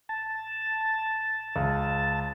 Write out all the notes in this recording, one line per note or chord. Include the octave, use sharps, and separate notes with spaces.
A5
C#2